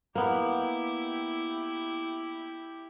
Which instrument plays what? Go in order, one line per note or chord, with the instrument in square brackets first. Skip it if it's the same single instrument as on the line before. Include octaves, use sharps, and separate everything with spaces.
[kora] A#3 B3 [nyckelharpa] E4 G4